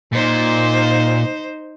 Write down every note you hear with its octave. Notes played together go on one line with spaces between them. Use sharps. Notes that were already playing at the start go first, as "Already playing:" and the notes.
A#2 D#4 C5